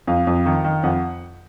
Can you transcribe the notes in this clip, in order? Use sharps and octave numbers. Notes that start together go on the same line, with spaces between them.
F2 F5
F2
D#3
D#3
F2 F#5